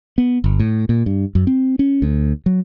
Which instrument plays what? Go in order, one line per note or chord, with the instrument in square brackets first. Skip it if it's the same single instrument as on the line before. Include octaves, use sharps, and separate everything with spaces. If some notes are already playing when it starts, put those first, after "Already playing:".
[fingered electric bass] B3
G1
A2
A#2
G2
F#2
C4
C#4
D2
F#3